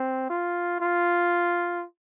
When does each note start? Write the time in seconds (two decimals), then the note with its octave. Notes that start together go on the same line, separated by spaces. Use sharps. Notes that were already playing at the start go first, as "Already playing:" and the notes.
Already playing: C4
0.30 F4
0.81 F4